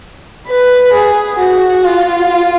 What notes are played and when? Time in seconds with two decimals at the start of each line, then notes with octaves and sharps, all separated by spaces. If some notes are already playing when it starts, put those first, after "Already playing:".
0.48 B4
0.94 G#4
1.39 F#4
1.84 F4